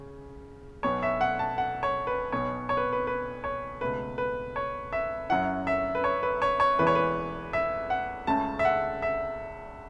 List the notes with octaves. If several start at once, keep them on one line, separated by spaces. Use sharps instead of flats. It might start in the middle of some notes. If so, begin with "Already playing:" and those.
Already playing: C#3 C#4
B1 B2 F#3 B3 C#5
E5
F#5
A5
F#5
C#5
B4
B1 B2 B3 C#5
C#5
B4
B4
B4
C#5
C#2 B2 A3 B4
B4
C#5
E5
F#2 F#3 C#4 E4 F#5
E5
B4
C#5
B4
C#5
C#5
E1 E2 E3 B4
C#5
B4
E5
F#5
C#2 C#3 A3 C#4 A5
E5
F#5
E5